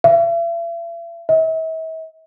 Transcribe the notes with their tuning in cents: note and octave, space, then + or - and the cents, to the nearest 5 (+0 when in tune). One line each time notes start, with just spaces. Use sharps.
E5 +45
E5 -40